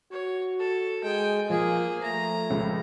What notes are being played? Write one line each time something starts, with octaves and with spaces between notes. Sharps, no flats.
F#4 C#5
A4
G#3 G5 G#5
F3 A#3 F4 G#4
A3 A#5
C#2 C#3 F3